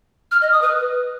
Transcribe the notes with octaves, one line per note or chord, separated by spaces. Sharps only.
F6
D#5
D#6
B4